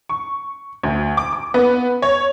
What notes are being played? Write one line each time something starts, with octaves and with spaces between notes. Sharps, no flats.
C#6
D2
D6
D6
B3
C#5